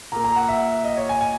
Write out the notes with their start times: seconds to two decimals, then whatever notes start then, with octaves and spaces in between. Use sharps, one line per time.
0.12 A#2 A#3 A#5
0.24 A#5
0.36 F#5
0.48 E5
0.84 D#5
0.97 C#5
1.09 G#5
1.21 G#5